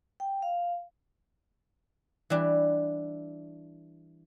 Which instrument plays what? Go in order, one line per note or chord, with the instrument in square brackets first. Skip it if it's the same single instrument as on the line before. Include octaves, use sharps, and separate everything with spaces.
[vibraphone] G5
F5
[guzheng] E3 G3 D4